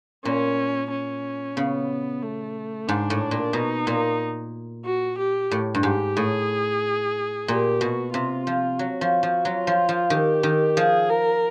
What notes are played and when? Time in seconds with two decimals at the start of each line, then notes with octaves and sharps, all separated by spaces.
0.25 A#2 C#4
0.91 C#4
1.56 C#3 B3
2.22 A3
2.88 G#2 D4
3.10 A2
3.31 A#2
3.53 B2 D#4
3.87 A#2
4.85 F#4
5.18 G4
5.51 A2
5.75 G2
5.83 G#2 G4
6.17 A2 G#4
7.48 A#2 G4
7.81 B2 F#4
8.14 C3 F4
8.47 F3
8.79 F#3 F#4
9.01 F3
9.23 F3
9.45 F#3 F4
9.67 F3
9.89 F3
10.10 D#3 G4
10.43 D#3
10.77 F3 G#4
11.10 A#4